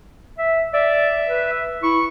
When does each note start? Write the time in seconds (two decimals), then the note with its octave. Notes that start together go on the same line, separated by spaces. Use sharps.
0.39 E5
0.73 D5 E5
1.28 B4
1.83 E4 C#6